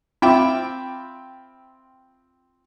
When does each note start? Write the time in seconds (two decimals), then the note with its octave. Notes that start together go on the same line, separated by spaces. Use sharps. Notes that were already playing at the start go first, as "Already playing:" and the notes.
0.22 C4 F4 E5 G5 B5 D6